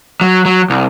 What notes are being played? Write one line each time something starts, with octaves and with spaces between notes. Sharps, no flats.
F#3
F#3
C2